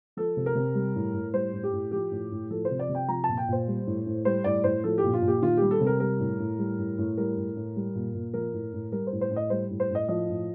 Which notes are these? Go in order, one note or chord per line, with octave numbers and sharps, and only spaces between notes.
F3 A4
C3
A#4
C3
G3
A2
A2
G3 C5
A2
G4
A2
F3 G4
A2
A2
F3 A4
C5
C3
D5
C3
G5
F3 A#5
A#2 A5
G5
A#2 C5
G3
A2
A2
G3 C5
A2 D5
A2 C5
F3 A4
G4
A#2
F4
A#2
G4
D#3 F4
G3 G4
A4
C3
A#4
G3 A#4
A2
A2
G3
A2
A2
G3 A#4
A2
A2
G3
A#2
A#2
F3 A#4
A2
A2
G3 A#4
C5
A2
C5
A2
D#5
G3 C5
A2
C5
A2 D#5
F3 D#5
A2